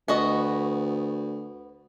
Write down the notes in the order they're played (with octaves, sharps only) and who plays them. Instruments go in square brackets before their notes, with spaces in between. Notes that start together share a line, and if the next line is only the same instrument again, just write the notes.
[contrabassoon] D2 [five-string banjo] B3 F#4 D#5